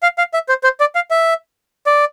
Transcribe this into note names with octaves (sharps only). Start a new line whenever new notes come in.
F5
F5
E5
C5
C5
D5
F5
E5
D5